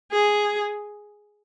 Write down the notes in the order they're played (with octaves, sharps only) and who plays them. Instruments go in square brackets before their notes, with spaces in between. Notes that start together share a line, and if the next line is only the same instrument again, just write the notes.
[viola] G#4